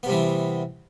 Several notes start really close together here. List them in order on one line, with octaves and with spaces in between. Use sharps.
B3 C3 G3 E3